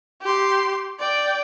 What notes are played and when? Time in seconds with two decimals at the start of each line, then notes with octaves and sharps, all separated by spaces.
0.22 G4 C6
1.00 D5 G5